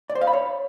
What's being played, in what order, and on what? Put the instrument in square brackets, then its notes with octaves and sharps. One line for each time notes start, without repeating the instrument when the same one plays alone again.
[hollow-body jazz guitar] D5
C5
F5
B5
C#5